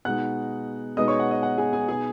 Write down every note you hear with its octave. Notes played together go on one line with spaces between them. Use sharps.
B2 G#3 D#4 F#5 F#6
B2 G#3 B3 D#4 D#5 D#6
C#5 C#6
F#5
D#5
F#5
G#4 G#5
G#4 G#5
B2 B3 D#4 G#4 G#5